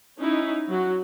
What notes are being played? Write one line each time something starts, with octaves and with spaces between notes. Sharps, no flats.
C#4 D#4 E4
F#3 F#4